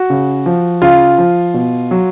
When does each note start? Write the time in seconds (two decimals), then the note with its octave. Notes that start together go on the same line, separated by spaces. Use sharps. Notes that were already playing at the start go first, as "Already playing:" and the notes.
Already playing: F#4
0.10 C#3
0.46 F3
0.82 C#3 F4
1.18 F3
1.54 B2
1.91 F#3